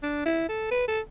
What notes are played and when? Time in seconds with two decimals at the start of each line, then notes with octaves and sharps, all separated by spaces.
0.03 D4
0.26 E4
0.49 A4
0.71 B4
0.88 A4